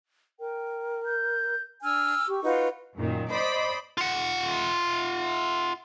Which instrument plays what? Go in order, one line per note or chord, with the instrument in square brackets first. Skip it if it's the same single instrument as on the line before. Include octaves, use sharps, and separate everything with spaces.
[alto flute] A#4 [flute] G5
[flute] G6
[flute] D4 [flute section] G#5 E6 F6
[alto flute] G4 [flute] C#6
[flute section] D#4 F4 F#4 [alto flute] B4
[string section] F#2 A#2 D#3
C5 D5 D#5 B5
[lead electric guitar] F4 F#5